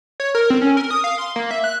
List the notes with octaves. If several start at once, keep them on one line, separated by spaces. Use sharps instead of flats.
C#5
A#4
C4
C#4
A#4
D#6
F5
C6
A#3
E5
F#6